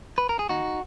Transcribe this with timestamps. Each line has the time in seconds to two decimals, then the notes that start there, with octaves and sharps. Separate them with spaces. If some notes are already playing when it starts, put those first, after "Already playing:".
0.18 B4
0.29 A#4
0.39 G#4
0.49 D#2 D#4 F#4